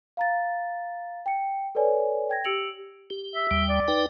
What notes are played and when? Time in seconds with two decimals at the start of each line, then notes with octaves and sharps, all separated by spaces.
0.17 F5 A#5 A6
1.26 G5 C#7
1.75 A4 B4 C#5 D5 G#5
2.29 G5 G#6 A#6
2.44 G4 E6 C#7 D7 F7 F#7
3.10 G4
3.35 E5
3.51 D#2 G3 G5
3.69 D5
3.88 D#4 B4 G5